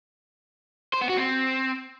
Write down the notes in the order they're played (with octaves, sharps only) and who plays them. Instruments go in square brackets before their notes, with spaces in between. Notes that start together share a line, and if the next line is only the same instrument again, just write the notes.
[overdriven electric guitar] C5
B3
F#4
C4